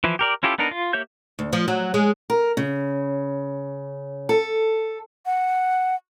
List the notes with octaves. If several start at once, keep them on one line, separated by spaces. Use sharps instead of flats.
E3 F3 E4
G4 A#4 D5
C#4 E4 F4 G4 A4
B3 D4 D#4 A#4
F4
A#3 G4 C#5 E5 G6
D2
F3
F#3
G#3
A#4
C#3
A4
F#5